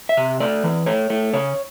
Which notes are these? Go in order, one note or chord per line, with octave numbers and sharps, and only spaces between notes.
E5
C3
A3 D5
E3
A3 C#5
A3
C#3 C#5